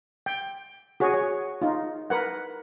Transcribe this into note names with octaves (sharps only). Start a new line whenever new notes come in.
G5
F#4 G#4 C#5
C#5
D#4 F4
A#4 B4 F#5